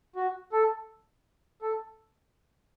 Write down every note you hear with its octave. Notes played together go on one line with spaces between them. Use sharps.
F#4
A4
A4